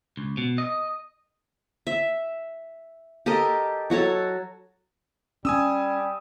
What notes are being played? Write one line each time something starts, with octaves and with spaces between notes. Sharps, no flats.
C#2
B2
D#5
E5
G4 A4 A#4 D#5
F#3 F#4 A4 C#5
G3 C#4 G#5 D#6 E6